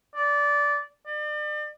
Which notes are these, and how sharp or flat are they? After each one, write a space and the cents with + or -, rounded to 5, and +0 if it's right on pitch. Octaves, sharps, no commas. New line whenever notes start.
D5 -15
D5 +40